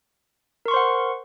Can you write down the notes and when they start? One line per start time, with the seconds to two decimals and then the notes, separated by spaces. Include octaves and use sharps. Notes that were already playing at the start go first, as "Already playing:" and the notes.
0.66 A#4
0.68 C#6
0.71 C6
0.74 C5
0.76 F#5